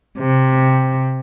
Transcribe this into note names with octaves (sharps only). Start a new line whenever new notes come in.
C3